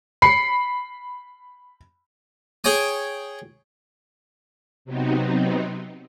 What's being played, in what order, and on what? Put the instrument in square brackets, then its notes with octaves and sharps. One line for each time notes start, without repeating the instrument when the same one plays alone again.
[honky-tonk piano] B5 C7 C#7
[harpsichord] G#4 C#5 G5 G#5 D#6
[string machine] C3 F#3 B3 C4 D#4